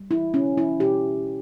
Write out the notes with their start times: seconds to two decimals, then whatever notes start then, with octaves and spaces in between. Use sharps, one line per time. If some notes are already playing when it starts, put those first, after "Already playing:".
Already playing: G3
0.11 E4
0.33 B2 C#4
0.58 E4
0.80 B2 G4